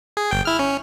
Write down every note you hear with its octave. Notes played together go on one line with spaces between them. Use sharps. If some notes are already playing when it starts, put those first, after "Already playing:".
G#4
G1 G5
E4 F6
C#4